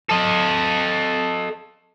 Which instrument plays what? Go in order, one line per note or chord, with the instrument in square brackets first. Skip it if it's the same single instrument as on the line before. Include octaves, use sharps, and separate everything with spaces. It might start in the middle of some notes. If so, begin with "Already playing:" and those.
[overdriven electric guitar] A4 D#5